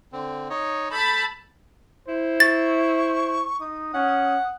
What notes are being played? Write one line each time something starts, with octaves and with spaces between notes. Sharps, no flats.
D3 C4
D#4 C#5 D#5
A4 A5 B5 G6
E4 C5
C#6 A6
D#4 D#6
C#4 F#5